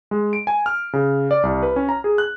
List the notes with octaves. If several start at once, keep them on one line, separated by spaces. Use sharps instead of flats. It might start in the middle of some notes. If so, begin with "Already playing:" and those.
G#3
D7
G#5
F6
C#3
D5
C2
B4
C#4
A#5
G#4
F#6